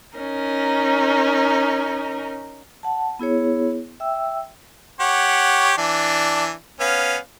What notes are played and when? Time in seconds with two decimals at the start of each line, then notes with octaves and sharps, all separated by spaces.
0.18 C#4 D#4 A#4
2.83 F#5 A5
3.19 B3 E4 G#4 C#5
4.00 E5 G5 E6
5.00 G4 C#5 F#5
5.78 E3 D4
6.80 B3 C#4 F5